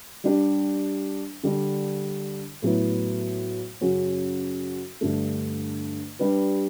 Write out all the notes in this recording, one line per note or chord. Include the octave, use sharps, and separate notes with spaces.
G3 D4 G4
D3 G3 D4
A2 F#3 B3 E4
F#2 C#3 F#3 C#4 F#4
G2 D3 A3
G3 D4 G4 B4